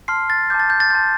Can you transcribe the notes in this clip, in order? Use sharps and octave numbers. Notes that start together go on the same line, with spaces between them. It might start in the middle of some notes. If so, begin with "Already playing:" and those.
A5 C6 F6 C7
A6
A5 D6 G6
A6
G6
A6
A5 C6 G6